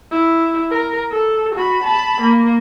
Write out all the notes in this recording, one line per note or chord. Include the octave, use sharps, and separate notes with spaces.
E4
A#4
A4
F#4 B5
A5 B5
A#3